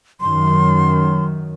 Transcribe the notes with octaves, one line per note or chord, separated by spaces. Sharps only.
F#2 D#3 C6